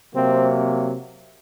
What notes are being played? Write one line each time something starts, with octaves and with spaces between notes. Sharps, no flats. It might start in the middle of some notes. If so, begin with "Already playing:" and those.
C3 F#3 A#3 C4